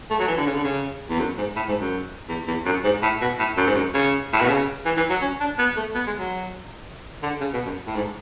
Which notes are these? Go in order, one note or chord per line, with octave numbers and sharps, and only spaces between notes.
A3
F#3
E3
D3
C#3
D3
C#3
E2
F#2
G#2
A2
G#2
F#2
E2
E2
F#2
G#2
A2
B2
A2
F#2
G#2
F#2
C#3
A2
B2
C#3
E3
E3
F#3
C#4
D4
B3
A3
B3
G#3
F#3
D3
C#3
B2
F#2
A2
G#2